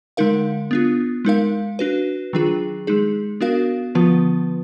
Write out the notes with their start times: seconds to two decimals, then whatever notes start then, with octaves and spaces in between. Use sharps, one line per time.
0.17 D3 G#3 D#4 A#4 F5
0.71 B3 D4 F4
1.25 G#3 D#4 A#4 F5
1.79 D4 F#4 B4
2.33 D#3 F#3 D4 F4 G#4
2.87 G#3 D#4 G#4
3.41 B3 D4 F#4 A#4 F5
3.95 D3 F3 B3 F4 B4